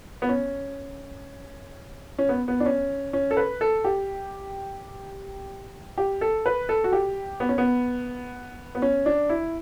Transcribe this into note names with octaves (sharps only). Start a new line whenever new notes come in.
B3
C#4
C#4
B3
B3
D4
C#4
C#4
A4
B4
A4
G4
G4
A4
B4
A4
F#4
G4
B3
C#4
B3
B3
C#4
D4
E4